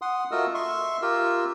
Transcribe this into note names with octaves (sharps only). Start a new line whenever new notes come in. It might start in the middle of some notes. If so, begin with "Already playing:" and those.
F#5 C6 D#6
A3 F4 F#4 A#4 D#5 E6
E5 C6 C#6
F4 G4 A#4 E6